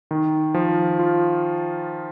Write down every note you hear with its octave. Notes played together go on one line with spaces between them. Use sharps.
D#3
F3
F4